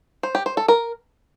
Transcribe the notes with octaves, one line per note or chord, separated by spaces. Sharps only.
C5
G4
C5
A4
A#4